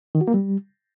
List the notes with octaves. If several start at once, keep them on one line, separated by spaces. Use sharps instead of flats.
D#3
F#4
A#3
G3